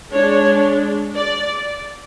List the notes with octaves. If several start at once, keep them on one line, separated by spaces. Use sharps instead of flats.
G#3 D4 C#5
D5